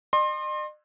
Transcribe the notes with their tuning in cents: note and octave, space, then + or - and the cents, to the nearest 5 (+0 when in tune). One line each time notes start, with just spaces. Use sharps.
D#5 -45 C6 +25